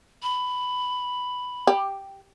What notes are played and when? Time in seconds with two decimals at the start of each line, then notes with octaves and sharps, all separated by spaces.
0.23 B5
1.67 G4